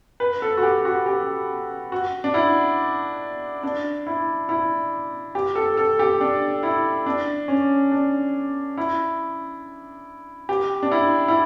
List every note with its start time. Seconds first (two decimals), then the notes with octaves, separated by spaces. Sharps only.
0.20 B4
0.42 A4
0.57 F#4
0.63 G4
0.85 F#4
1.06 G4
1.92 F#4
2.24 D4
2.34 E4
3.63 D4
4.07 E4
4.49 E4
5.35 G4
5.55 A4
5.77 A4
5.99 G4
6.21 D4
6.63 E4
7.06 D4
7.48 C#4
7.92 D4
8.77 E4
10.49 G4
10.83 D4
10.92 E4
11.28 E4